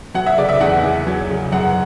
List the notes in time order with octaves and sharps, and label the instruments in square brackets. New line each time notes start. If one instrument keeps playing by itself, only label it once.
[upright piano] F#3 F#5
E5
C#3 D5
E5
E2 F#5
E2
F#3
C#3
F#2 F#5